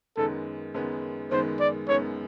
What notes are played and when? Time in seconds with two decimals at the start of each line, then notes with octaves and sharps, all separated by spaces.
0.17 F#2 D#3 G#3 B3 A4
0.74 F#2 D#3 G#3 B3
1.31 F#2 D#3 G#3 B3 C5
1.60 D5
1.88 F#2 D#3 G#3 B3 C#5